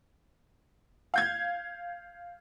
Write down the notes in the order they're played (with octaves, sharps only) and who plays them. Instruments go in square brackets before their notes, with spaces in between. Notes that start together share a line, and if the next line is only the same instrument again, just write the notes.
[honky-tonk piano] F5 G6 G#6